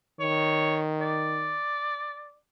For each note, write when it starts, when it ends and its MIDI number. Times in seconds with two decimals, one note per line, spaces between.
0.20 1.59 51
0.20 0.80 73
1.01 2.36 74